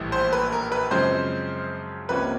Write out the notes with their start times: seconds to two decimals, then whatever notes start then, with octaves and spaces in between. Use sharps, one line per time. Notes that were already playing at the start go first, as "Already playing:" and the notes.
Already playing: A#1 A2 E3 G3
0.12 C5
0.33 B4
0.52 A#4
0.72 B4
0.91 F#2 C#3 F3 G#3 C4 C5
2.08 C#2 C3 F3 A#3 C#4 B4